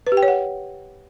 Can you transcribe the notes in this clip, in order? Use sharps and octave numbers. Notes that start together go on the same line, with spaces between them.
B4
G4
G5
C#5
F#5